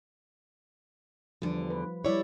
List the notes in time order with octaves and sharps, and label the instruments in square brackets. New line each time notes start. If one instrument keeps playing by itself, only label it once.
[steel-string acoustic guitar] E2 D3 [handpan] F3 G3
[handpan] B4
[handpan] G3 D5 [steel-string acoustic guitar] E4 C#5